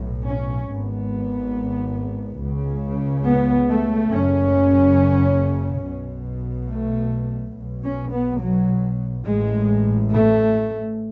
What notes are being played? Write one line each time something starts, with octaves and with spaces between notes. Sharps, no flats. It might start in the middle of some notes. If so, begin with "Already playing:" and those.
Already playing: B1 A2
C#4
G#1 G#2 B3
C#2 C#3
B3
A3
F#1 F#2 C#3 C#4
B1 B2
A3
B1 B2
C#4
B3
F#3
A1 A2 G#3
A3